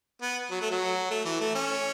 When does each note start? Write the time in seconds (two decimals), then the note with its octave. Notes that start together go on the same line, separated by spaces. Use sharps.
0.22 B3
0.51 F#3
0.62 A3
0.70 F#3
1.11 A3
1.25 E3
1.41 A3
1.55 C#4